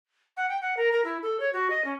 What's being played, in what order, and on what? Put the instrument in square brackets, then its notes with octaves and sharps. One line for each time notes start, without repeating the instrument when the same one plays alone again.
[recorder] F#5
G5
F#5
A#4
A#4
E4
A4
C#5
F#4
D#5
C#4